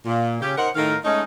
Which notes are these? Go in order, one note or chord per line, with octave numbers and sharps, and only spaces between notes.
A#2
C#3 C#4 G4
D#4 A#4 C5 F#5
A2 D#3 D#4 A4 A#4 F5
G#3 A3 C#4 D#4